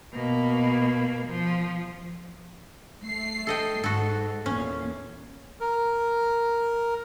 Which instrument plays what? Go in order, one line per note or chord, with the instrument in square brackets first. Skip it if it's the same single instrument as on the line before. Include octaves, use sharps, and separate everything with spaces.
[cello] B2 A#3
F3
[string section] A3 C7
[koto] A4 D#5 G5
[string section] G#2 [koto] F#4 A4
[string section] E2 A#2 [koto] C#4
[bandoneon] A#4